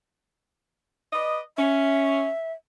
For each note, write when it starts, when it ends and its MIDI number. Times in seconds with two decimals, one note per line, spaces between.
1.13 1.39 71
1.13 1.39 74
1.13 1.39 75
1.57 2.28 61
1.57 2.53 76